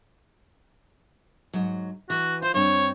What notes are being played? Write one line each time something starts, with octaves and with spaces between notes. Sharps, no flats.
G#2 F#3
E3 F#4
F4 C5
G2 C4 C#5